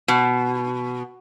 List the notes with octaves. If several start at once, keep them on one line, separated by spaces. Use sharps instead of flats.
B2